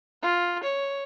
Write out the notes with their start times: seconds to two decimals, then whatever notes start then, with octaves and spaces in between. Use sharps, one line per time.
0.23 F4
0.64 C#5